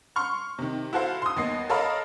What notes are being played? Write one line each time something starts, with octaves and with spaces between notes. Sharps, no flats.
C6 C#6 F6
C3 D#3
E4 F#4 A4 C5 F5
C6 D#6
D#2 B3 D#5 C7
A4 A#4 C#5 D#5 F5 B5